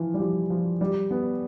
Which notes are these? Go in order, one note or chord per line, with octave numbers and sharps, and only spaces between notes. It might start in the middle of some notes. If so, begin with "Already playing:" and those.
Already playing: E3 F3
G3
F3
F3
G3
B3